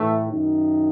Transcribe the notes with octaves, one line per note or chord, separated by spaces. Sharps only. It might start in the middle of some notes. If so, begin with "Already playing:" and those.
Already playing: A2 E3 A3
F#2 D#3